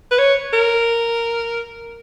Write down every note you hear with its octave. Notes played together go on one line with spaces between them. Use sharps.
B4
C#5
A#4